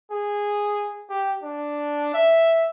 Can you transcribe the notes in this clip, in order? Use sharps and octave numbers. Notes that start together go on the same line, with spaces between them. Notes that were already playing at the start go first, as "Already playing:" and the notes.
G#4
G4
D4
E5